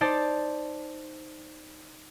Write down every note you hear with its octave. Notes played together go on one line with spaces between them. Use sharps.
D#4 C5 D5 A5